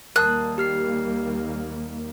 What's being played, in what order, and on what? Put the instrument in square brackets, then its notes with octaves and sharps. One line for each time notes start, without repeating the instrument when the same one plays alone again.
[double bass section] D#2 G3 A#3 [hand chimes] A#4 A5 D#6 [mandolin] F#6
[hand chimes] G4 F6 C7